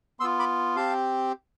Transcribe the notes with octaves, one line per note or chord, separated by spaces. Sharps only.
B3 F4 C6 E6
B5 D6
C4 G4 F5 A5